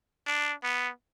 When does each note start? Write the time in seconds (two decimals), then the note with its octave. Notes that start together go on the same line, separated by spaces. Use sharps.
0.26 D4
0.63 B3